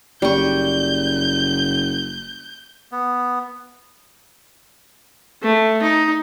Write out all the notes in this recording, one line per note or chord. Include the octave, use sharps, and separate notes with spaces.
F#1 G3 C#6 G6
B3
A3
D#4